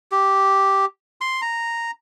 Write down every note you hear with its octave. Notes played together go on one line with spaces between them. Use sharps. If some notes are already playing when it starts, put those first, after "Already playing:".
G4
C6
A#5